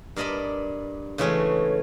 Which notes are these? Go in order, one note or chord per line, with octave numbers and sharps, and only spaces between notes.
G2 A#4 D5 D#5 A5 B5
C#3 E3 G#3 A3 C#4 C#5